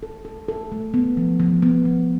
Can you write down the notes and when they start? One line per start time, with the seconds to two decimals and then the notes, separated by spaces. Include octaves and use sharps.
0.03 A4
0.25 A4
0.48 A4
0.72 A3
0.94 B3
1.17 F3
1.40 F3
1.62 B3
1.85 F3